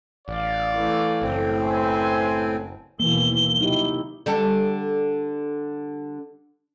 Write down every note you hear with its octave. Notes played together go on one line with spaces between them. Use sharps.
A1 D5 F5
E3 A3
F#1 A2 C4
B4 C5 E5 G#5
D#2 B2 E3 A#3 G7
C3 F#3 D#4 E4 G4
D3 G3 A4